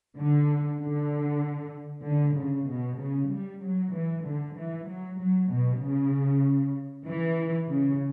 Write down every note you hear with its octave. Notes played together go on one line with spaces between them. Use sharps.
D3
D3
D3
C#3
B2
C#3
G3
F#3
E3
D3
E3
F#3
F#3
B2
C#3
E3
C#3